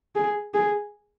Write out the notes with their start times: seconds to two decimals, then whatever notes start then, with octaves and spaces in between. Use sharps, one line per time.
0.16 G#4
0.54 G#4